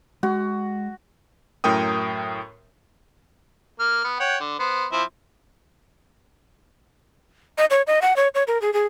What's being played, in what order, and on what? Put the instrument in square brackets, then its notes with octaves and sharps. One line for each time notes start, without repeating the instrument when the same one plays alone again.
[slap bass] G#3 [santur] F#4
[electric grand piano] F#2 A2 A#4 G5 D#6
[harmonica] A#3 F6
B3
C#5 F#5 G5
D3
B3 C5
F3 C4 E4
[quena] D#5
C#5
D#5
F#5
C#5
C#5
A#4
G#4
G#4